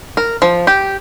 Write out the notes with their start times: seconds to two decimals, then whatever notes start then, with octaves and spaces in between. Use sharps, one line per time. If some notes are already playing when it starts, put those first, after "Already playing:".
0.17 A#4
0.42 F3
0.67 G4